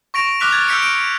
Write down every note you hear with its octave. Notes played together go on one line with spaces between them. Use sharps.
C#6 A#6 D7 F7
D6 F6 F#6 B6 F7
F6 G#6 A6
E6 F6 G6 B6 C#7 D7
D7